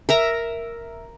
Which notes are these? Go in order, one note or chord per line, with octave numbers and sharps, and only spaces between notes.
A#4 E5 A#5